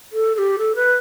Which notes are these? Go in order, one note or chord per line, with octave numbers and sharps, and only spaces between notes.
A4
A4
G4
A4
B4